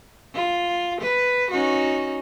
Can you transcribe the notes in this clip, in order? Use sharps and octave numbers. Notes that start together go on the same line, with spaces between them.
F4
B4
C#4 D#4 F#4